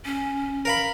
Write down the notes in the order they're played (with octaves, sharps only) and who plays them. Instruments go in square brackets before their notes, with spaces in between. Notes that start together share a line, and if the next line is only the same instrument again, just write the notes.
[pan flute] C#4
[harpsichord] A#4 F5 B5